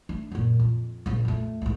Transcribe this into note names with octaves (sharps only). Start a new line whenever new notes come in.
A3 D4
F#2 A#2
F2
A#1 C#3
F2 A3
C2 G#2